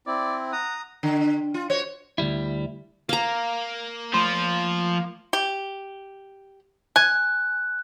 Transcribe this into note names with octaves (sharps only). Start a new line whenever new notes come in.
C4 E4 D5
F#5 A#5 D#6
D3
F4
F#4 C5 C#5
D2 G2 G3 E4
A#3 F5 A#5
F3 A3 C6
G4
G#5 F#6